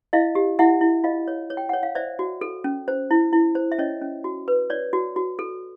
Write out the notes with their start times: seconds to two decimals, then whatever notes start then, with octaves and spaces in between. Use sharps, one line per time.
0.13 E4 D#5 F5
0.35 G4
0.59 E4 E5 F#5
0.81 E4
1.04 F4 D#5 F5
1.28 C#5
1.50 C#5
1.57 G5
1.69 C#5 F#5
1.83 F5
1.95 C5 D5 E5
2.19 F#4
2.41 A4
2.64 C#4
2.88 C5
3.11 E4
3.33 E4
3.55 C5
3.72 E5
3.78 C#4 C#5 D#5
4.02 C#4
4.24 F#4
4.48 B4
4.70 C#5 D5
4.93 F#4
5.16 F#4
5.39 A4